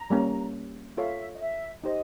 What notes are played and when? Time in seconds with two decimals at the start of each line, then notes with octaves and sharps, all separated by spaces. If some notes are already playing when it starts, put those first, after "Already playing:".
Already playing: A#5
0.10 G3 A#3 C#4
0.96 F4 A4 C#5 E5 F5
1.35 D#5
1.41 E5
1.83 D#4 G4 C5 D#5